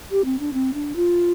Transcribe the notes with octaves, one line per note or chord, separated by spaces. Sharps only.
G4
C4
D4
C4
D4
F4